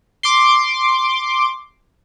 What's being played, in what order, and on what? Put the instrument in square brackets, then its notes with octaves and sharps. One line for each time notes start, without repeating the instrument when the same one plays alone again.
[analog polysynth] C6 D6